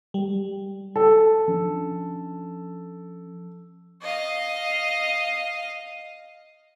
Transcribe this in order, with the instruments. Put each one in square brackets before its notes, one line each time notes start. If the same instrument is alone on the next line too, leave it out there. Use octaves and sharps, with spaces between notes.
[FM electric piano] G3
[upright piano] A4
[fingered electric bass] F3 C#4 D4
[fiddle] D#5 F5